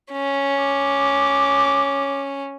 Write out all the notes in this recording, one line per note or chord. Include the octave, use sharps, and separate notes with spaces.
C#4
D6